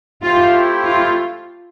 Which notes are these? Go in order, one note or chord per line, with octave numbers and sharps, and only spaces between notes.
A3 C4 E4 F4 G4 C5
F4